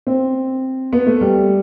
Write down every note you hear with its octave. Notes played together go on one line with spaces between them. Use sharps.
C4
B3
A3
G3